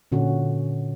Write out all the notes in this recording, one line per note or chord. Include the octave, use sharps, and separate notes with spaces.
A#2 D3 C#4 F#4